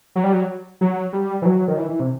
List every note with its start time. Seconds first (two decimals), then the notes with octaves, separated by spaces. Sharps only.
0.16 F#3
0.24 G3
0.33 F#3
0.81 F#3
1.13 G3
1.42 E3
1.45 F#3
1.68 D#3
1.78 E3
1.89 E3
2.00 C3